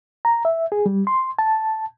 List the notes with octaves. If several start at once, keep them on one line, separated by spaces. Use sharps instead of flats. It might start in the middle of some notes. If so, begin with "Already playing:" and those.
A#5
E5
G#4
G3
C6
A5